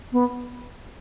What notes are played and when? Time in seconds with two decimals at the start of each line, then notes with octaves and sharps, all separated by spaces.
0.12 B3